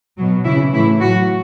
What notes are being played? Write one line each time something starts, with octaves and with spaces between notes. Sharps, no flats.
B2 F#3
C#3 E3 E4
A2 E3 E4
A2 F#3 F#4